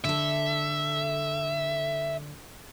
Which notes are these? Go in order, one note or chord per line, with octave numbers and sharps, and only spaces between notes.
D3 A4 E5